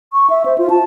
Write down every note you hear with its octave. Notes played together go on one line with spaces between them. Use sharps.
C#6
E5
C5
F4
A5